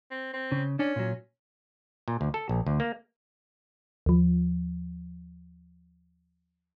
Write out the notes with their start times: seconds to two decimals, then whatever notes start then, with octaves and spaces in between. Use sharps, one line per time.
0.11 C4
0.33 C4
0.52 C#3
0.79 C#4 D4
0.96 A#2 F#3
2.08 A#2
2.21 D2
2.34 A4
2.49 A#1
2.67 D2
2.80 A#3
4.06 D#2 F3